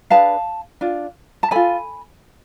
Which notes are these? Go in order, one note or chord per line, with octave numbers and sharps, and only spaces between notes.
D4 G#4 B4 F5 A5
D4 F4
A5
F4 A4 G#5 B5